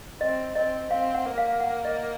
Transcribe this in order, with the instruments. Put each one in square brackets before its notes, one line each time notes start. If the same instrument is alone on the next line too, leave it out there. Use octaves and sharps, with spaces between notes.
[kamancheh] C4 [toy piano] D#5
[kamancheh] C4 [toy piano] D#5
[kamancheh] C4 [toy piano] F5
[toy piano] F#5
[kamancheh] A#3
[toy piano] F5
F#5
D#5